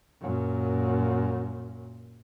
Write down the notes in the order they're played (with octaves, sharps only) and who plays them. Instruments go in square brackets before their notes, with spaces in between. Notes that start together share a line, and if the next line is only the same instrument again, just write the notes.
[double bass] F#2 A#2